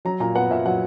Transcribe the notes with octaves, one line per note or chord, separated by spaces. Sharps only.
F#3 A#5
A#2 A#5
B3 F#5
A#2 E5
F#3 F#5